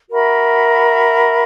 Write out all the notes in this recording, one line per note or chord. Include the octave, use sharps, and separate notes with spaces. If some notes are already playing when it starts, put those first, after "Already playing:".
F#4 A#4 E5 B5